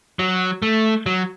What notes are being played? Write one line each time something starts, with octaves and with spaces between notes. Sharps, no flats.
F#3
A3
F#3